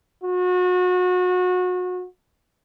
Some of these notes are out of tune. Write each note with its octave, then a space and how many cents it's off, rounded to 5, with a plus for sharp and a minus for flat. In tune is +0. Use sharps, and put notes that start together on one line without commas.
F#4 -30